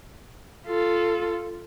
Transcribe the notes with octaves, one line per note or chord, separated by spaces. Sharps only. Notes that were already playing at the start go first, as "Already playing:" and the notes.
F4 A4